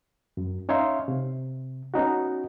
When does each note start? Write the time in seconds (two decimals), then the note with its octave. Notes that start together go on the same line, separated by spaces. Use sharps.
0.37 F#2
0.69 C#4 D#4 C#5 E5 F5 C6
1.08 C3
1.94 B3 C#4 D#4 F#4